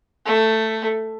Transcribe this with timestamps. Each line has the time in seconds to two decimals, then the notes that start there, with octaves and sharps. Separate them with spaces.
0.25 A3